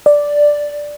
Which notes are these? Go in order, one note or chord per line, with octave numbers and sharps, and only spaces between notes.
D5